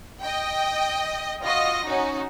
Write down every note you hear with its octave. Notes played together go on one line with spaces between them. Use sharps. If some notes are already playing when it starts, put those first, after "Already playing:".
D#5 G5
F4 F#4 D#5 A#6
C#4 D#4 F#4